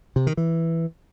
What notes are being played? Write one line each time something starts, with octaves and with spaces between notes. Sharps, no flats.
C3
D#3
E3